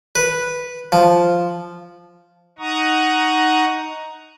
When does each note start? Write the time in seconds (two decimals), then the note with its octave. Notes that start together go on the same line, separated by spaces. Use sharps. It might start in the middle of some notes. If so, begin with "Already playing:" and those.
0.15 B4
0.92 F3
2.59 D#4 F#5 A#5 C#6 D#6